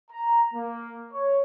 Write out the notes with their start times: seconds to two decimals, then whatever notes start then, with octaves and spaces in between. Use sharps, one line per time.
0.11 A#5
0.54 A#3
1.13 C#5